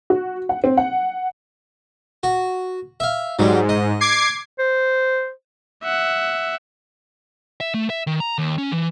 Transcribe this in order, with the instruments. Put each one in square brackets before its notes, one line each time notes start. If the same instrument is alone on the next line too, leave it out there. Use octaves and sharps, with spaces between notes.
[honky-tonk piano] F#4
F#5
C4
F#5
[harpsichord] F#4
E5 F5
[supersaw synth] G#2 [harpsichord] F#3 G3
[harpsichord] D#5
[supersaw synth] D6 G#6 C7
[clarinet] C5
[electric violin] E5 F#5
[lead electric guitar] E5
A3
E5
D#3
A#5
D#2
C#4
E3